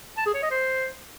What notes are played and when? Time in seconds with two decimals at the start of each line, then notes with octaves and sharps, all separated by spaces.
0.18 A5
0.26 G#4
0.34 C#5
0.43 D#5
0.51 C5